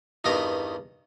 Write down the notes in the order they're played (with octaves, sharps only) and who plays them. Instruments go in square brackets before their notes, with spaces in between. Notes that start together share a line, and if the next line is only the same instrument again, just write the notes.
[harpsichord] E2 G2 D#3 B3 D#5 A#5